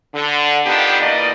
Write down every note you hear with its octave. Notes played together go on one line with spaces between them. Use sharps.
D3
D3 D#3 B3 D4 F4 G4
B2 E3 A#3 D5 D#5